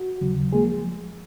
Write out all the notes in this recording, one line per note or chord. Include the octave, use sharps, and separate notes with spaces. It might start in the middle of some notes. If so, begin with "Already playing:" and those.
Already playing: F#4
D#2 C#3 F#3
F3 G#3 A#3 G#4